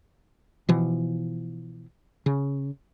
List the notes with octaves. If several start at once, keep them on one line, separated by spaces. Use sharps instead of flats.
B2 E3 F3
C#3